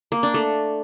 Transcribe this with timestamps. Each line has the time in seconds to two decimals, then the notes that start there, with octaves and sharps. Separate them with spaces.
0.12 A#3
0.23 D4
0.34 A3